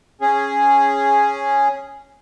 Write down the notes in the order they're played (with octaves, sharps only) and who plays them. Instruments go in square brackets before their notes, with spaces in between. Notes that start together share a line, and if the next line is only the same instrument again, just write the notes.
[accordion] C#4 G#4